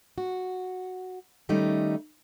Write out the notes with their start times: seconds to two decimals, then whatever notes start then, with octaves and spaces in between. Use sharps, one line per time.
0.18 F#4
1.49 D#3 G3 A3 C#4 D#4